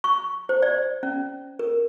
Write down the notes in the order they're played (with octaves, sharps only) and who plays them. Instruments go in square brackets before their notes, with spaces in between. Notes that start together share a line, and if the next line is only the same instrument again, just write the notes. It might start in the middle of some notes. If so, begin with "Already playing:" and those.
[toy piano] C#6
C5
D5
C#4
A#4